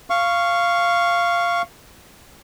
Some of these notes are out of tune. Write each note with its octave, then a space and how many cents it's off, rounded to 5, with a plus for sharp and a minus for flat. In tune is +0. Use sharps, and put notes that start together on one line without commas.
F5 -10 C#6 +0